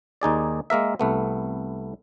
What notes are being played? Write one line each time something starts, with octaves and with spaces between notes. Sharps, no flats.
D#2 D#4 G#4 D5
G#3 A#3 A#4 E5
C2 A3 B3